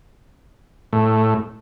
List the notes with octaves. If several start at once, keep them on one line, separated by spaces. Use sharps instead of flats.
A2